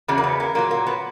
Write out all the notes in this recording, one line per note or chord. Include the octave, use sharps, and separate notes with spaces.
E2 C#3 F#3
A#3
B3
A#3
A#2 F#3 A#3
A#3
B3